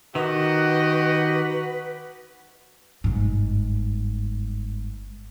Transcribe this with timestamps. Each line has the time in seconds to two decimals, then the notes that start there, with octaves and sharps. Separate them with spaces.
0.15 D#3 F#4 G4 B4 D#5 F#5
3.04 G1 G#2